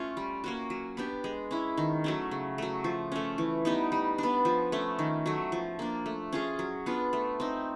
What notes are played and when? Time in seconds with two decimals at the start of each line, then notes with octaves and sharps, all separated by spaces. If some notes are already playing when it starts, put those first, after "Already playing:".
Already playing: A3 C#4 F4
0.17 G3
0.44 A#3 C#4 F#4
0.70 F#3
0.97 B3 D4 G4
1.24 G#3
1.51 C#4 E4
1.77 D#3
2.04 F#3 A3 C#4
2.31 C#3
2.58 F#3 A3
2.84 F3
3.12 A3 C#4
3.38 E3
3.65 G3 B3 D#4
3.92 G3
4.18 B3 D4
4.45 F3
4.72 A3 C#4
4.99 D#3
5.26 F#3 A3
5.52 F3
5.79 A#3 D4
6.06 A3
6.33 C#4 F4 G#4
6.59 F#3
6.86 B3 D4 F4
7.13 A3
7.40 C4 D#4